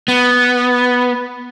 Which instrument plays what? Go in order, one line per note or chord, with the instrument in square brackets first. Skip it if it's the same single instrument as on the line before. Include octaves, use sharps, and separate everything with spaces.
[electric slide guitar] B3